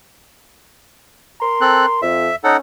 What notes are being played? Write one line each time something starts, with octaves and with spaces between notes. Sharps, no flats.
A#4 A#5 C6
C4 A4 F#6
F2 E5
C#4 D#4 A4 F#5